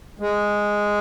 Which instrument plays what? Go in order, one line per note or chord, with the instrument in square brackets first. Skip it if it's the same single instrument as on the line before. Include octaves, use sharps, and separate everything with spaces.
[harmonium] G#3